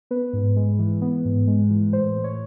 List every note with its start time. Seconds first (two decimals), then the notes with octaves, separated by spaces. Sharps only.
0.11 B3 B4
0.33 G#2
0.56 G#3
0.79 E3
1.02 B3
1.25 G#2
1.47 G#3
1.70 E3
1.92 A2 C5
2.16 A2
2.24 C#5